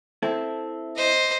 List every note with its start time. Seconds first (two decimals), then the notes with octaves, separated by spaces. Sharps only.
0.23 C4 E4 A4
0.96 C5 D#5